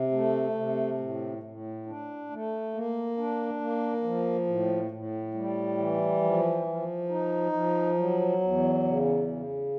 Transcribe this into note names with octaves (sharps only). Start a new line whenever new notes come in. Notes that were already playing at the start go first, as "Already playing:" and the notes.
Already playing: C3
A3
C3
A2
A2
D4
A3
A#3
D4
A#3
F3
A2
A2
G3
E3
F3
F3
D#4
F3
F#3
E2
C#3
C#3